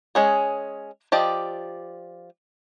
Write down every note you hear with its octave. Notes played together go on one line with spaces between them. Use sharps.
G#3 C#4 G#4
F3 G4 D5 D#5